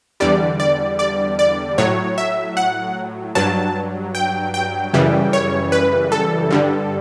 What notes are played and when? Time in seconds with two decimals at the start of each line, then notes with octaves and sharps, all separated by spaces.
0.20 E2 D3 G3 D5
0.60 D5
0.99 D5
1.39 D5
1.78 A2 F#3 C#5
2.18 E5
2.57 F#5
3.35 G2 F#3 A5
4.15 G5
4.54 G5
4.94 F#2 C#3 E3 G3
5.33 C#5
5.72 B4
6.12 A4
6.51 G2 D3 G3